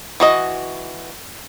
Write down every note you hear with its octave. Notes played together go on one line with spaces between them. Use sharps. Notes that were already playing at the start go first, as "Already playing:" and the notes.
E3 F#4 D#5